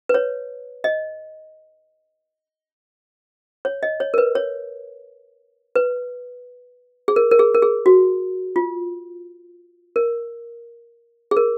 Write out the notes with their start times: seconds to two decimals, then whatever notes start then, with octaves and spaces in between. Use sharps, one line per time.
0.09 B4
0.14 C#5
0.84 D#5
3.65 C#5
3.83 D#5
4.00 C#5
4.14 A#4
4.18 B4
4.35 C#5
5.76 B4
7.08 G#4
7.16 A#4
7.31 A#4
7.39 G#4
7.54 A#4
7.62 G#4
7.86 F#4
8.56 F4
9.96 A#4
11.31 G#4
11.37 A#4